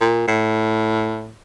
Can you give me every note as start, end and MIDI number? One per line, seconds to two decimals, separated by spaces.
0.01 0.25 46
0.28 1.33 45